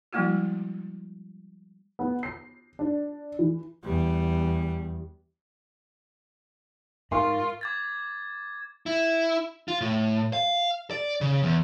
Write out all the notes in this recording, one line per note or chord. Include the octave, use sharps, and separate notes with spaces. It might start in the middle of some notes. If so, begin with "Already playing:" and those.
F3 G3 G#3 A#3 E4 F#4
B3
C7
D4
E3
E2 G3
G#2 F4 A#4 C6 C#6
D6 G#6 A6
E4
F4
A2
F5
D5
C#3
E2